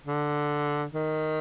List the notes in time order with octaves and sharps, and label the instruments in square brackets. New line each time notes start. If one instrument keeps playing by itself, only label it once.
[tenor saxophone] D3
D#3